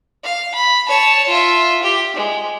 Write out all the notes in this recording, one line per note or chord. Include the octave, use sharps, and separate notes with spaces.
F5
B5
C#5 A5
F4 E5
G4
G#3